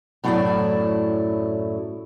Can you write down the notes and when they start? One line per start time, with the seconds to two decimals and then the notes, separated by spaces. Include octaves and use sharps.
0.24 F#2 A2 F#3 A3 E4 D5